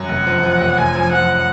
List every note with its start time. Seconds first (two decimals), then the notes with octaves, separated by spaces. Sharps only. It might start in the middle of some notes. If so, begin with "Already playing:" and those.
Already playing: F#2
0.09 F1 F#5
0.27 F3
0.43 F3
0.61 F1
0.78 F1 G#5
0.95 F3
1.12 F3 F#5